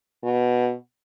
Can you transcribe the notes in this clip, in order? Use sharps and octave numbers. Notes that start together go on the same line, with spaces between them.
B2